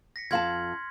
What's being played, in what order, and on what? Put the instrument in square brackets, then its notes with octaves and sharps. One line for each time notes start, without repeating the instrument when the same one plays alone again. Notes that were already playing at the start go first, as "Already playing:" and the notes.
[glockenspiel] A#6 B6 C#7
[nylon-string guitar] F2 F5 A5 [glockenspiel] C6 F6 G#6